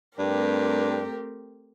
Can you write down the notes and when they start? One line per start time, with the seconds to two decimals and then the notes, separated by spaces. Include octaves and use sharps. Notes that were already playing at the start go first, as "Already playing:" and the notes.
0.18 G2 A3 C4 G4 A#4